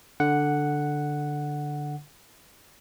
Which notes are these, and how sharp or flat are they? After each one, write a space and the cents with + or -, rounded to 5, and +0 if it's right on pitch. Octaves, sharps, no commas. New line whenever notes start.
D3 +0 F#5 +0